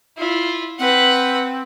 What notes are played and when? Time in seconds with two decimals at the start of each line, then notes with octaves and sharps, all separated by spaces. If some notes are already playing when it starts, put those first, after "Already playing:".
0.18 E4 F4
0.79 C4 B4 F#5